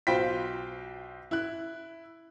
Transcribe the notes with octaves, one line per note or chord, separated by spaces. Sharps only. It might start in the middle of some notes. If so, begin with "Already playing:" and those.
B1 F4 C5 G5 B6
E4 F#6